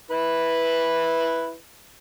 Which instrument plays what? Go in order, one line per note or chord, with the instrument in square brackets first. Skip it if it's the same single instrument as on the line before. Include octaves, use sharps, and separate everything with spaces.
[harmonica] E4 B4